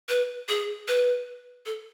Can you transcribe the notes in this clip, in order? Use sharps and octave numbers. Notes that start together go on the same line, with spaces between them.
B4
G#4
B4
A4